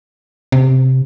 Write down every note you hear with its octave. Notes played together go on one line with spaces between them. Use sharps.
C3